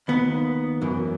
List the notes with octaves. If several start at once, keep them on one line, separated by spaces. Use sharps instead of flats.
D#2 D#3 B3
F#2 E3